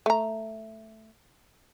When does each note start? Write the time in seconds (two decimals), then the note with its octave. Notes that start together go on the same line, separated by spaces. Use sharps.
0.06 A3 A#5